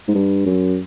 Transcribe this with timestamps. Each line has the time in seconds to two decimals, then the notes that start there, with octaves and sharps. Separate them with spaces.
0.08 G#2
0.15 G2
0.46 F#2